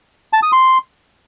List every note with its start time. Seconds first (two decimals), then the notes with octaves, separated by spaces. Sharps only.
0.33 A5
0.43 D#6
0.52 C6